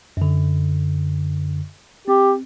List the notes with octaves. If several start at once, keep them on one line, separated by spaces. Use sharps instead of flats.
F#2 D3
C4 G4